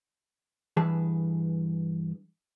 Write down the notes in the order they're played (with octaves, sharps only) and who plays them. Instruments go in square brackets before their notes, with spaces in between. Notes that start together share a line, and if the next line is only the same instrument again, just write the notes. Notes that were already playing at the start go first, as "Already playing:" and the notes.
[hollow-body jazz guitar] G2 E3 G#4 B4 A5